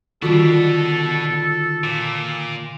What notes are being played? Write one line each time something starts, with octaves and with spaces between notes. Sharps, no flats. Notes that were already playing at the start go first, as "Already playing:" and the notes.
B2 D3 D#3 G3 B3 F4 F#4 A4
A#2 D6